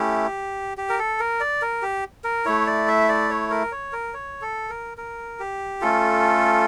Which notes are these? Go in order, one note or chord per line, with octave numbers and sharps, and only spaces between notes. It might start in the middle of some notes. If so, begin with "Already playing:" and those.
Already playing: A3 C#4 E4 G4
G4
A#4
A4
A#4
D5
A#4
G4
A#4
A3 E4 C#5
D5
E5
D5
C#5
A#4
C#5
A#4
C#5
A4
A#4
A#4
G4
A3 C#4 F4 A4